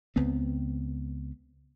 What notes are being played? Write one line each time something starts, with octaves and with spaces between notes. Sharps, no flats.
C#2 B3 C4